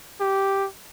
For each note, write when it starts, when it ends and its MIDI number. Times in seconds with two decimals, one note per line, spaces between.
0.21 0.67 67